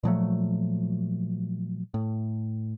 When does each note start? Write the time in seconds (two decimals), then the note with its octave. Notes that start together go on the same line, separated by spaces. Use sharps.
0.03 A#2 F3 F#3 A3
1.94 A2